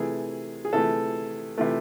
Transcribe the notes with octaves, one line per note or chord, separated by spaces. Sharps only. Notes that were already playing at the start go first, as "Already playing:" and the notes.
Already playing: C3 E3 A3 G#4
G#4
C3 E3 A3 A4
C3 E3 A3